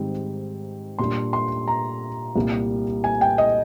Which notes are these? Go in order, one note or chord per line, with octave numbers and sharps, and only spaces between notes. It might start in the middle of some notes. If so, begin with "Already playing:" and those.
Already playing: G#2 D#3 G3 C4 D#4
A#2 G3 D4 C6
C6
A#5
C2 A#2 G3 A#3
G#5
G5
D#5